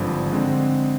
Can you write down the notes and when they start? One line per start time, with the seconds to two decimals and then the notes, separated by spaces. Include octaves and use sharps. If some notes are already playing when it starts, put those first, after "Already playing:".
Already playing: G#1 G2 D3 F3
0.32 D3 G#3 C4